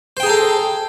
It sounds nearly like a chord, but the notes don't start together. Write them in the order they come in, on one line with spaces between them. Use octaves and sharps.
C5 G5 G#4 A#5 A4